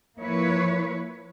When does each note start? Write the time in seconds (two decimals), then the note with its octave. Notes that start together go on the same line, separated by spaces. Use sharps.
0.18 F3 A#3 E4 B4 C#5